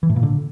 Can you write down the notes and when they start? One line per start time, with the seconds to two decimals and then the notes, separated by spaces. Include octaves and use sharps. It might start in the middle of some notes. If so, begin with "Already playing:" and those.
0.03 E3
0.09 A2
0.16 A#2
0.23 D3